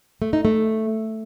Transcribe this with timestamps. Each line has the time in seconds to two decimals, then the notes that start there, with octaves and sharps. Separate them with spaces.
0.22 A3
0.33 D#4
0.45 A3